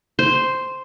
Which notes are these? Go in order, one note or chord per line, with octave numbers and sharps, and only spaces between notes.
C5